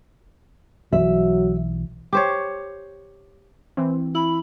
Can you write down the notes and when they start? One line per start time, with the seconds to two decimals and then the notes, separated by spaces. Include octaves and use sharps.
0.93 B1 E3 F#3 E5
2.13 G4 C5 C#5
3.77 E3 C4
4.15 E4 B5 F#7